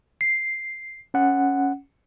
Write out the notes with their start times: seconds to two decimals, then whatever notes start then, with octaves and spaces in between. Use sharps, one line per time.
0.21 C7
1.14 C#4 F#5